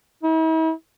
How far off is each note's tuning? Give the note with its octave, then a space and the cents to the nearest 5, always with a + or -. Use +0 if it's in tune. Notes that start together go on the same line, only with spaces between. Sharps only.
E4 -45